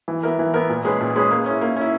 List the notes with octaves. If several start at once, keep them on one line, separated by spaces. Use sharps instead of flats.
E3
B3 E4 A#4
E3
B3 E4 A#4
A#2
G#3 C#4 G#4 B4
A#2
G#3 C#4 G#4 B4
A#3
C#4 E4
A#3
C#4 E4